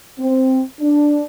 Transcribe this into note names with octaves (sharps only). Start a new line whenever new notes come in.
C4
D4